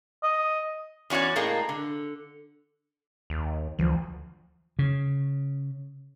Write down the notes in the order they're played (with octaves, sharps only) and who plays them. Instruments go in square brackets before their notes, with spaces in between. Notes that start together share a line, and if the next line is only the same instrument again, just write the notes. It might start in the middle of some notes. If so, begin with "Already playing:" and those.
[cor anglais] D#5
[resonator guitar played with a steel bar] E2 C#4 F#4 C#5 D5
A2 G#3 A#3
D3
[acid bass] D#2
[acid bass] D2 [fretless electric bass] E3 F3
[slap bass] C#3